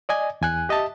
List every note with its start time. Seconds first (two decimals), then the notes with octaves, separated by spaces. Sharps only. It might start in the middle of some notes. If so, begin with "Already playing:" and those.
0.09 D5 D#5 G#5
0.41 E2 G#5 F#6
0.69 G4 D#5 E5 A5